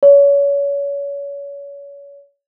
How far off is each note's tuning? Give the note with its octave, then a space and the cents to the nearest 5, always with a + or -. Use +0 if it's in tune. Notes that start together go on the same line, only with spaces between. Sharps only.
C#5 +30